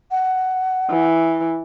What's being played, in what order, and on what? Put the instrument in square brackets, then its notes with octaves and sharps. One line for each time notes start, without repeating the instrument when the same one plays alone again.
[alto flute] F#5
[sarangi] E3